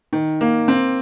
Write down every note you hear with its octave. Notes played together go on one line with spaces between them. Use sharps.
D#3
A#3
C4